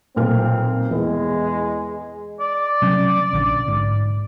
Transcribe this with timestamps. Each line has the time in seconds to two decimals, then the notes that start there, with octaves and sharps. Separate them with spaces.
0.16 B1 A#2 C4 F6
0.91 E2 G#3
2.40 D5
2.82 C3 F#3 C#4
3.33 A#1 D3
3.68 G#2